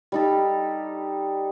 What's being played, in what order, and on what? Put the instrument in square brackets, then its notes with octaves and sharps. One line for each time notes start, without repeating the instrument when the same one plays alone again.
[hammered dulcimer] G3 D#4 A4